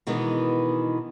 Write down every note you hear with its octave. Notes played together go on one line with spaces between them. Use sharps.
B2 D#3 E3 G#3 B3